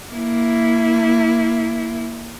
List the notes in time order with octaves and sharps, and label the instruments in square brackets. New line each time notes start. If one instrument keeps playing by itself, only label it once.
[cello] A#3 E4